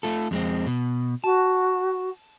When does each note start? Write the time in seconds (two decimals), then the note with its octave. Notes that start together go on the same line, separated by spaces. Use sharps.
0.03 A3 F4 A4
0.31 F2 G#3 C4
0.67 B2
1.24 F#4 A5